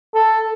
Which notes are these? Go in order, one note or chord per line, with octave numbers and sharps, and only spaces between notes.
A4